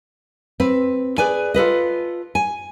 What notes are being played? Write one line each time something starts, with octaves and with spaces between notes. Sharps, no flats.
C4 B4
G#4 B4 D5 G#5
F4 A4 B4 D#5
G#5